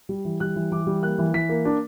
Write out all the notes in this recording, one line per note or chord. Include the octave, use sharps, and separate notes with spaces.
G3
E3
G3 F#6
E3
E3 D6
G3
A#3 F#6
E3
E3 B6
A#3
D4